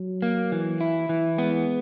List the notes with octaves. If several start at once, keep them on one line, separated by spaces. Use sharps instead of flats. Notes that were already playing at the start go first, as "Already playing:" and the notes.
Already playing: F#3
A#3
E3
E4
E3
G#3 B3